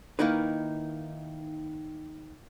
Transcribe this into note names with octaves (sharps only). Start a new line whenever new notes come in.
D#3 A#3 D#4 E4 B4